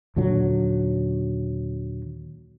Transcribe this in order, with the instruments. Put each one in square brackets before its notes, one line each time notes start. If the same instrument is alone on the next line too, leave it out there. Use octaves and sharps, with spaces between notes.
[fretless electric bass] D#2 A#2 D3 F#3